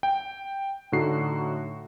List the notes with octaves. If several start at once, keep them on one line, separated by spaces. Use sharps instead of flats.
G5
A2 D3 D#4 F#4 C7